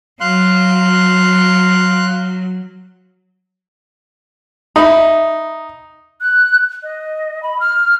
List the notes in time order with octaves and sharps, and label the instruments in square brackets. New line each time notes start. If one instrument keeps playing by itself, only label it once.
[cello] F#3 [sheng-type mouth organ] F5 C6 F#6
[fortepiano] D#4 [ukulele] E5 B5
[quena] F#6
D#5
B5
F6